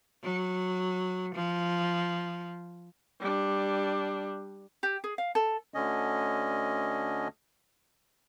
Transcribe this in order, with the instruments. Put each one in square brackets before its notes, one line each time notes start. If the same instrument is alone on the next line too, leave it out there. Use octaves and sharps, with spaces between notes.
[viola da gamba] F#3
F3
[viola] G3 D4
[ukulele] G4
G#4
F5
A4
[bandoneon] D2 D3 C#4 D#5